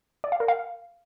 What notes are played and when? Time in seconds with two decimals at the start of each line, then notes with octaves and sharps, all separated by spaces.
0.24 D5
0.32 F5
0.40 A#4
0.48 F5